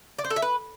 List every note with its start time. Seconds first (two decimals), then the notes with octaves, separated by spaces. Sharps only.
0.19 D5
0.24 C5
0.30 A4
0.36 E5
0.42 B4